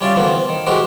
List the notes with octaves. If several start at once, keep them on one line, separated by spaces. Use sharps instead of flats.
G3 C#4 F4 D5 E5 F5
D2 E3 F3 A#3 B3
C4
D#3
E3 G#3 C4 F#4 G4 A#4